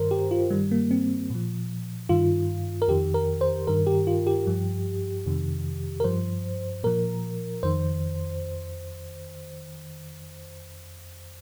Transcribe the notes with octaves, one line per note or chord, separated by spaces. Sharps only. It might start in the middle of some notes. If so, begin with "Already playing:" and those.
Already playing: G2 D#3 A#4 C5
G4
F4
G2 D#3 G3
A#3
C4
A#2 F3
G2 D#3 F4
A#4
F2 D#3 G4
A#4
C5
G2 D#3 A#4
G4
F4
G4
G2 F3
F2 C3 D#3
A#4
G2 F3 C5
A#2 F3 A#4
F2 D#3 C5